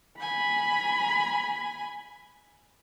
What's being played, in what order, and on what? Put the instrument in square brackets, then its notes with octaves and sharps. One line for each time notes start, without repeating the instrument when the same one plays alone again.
[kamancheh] G#5 [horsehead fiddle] B5